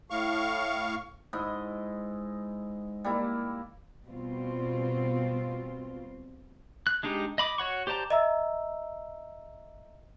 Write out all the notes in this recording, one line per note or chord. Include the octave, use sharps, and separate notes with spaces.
A2 F5 C#6
G#2 E4 D#5
G3 A#3 E4
B2 G3 C4 F4
F#6
G#3 D4 D#4 G4
D#5 B5 D6
F#4 C#5 F#5 C#6
G4 C5 D5 A5 A#5
D#5 E5 A#5 E6